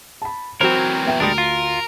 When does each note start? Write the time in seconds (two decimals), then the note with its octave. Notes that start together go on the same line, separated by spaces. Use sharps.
0.22 A5 B5
0.61 E3 F#3 C4 F#4 A#4 C5
1.05 B3 E5 G5
1.20 D2 G3 G#3 D4 A#4 A#6 D7
1.38 F4